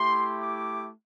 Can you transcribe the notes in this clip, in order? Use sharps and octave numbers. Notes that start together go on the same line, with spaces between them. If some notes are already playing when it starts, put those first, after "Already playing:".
Already playing: A3 E4 G4 C6
D6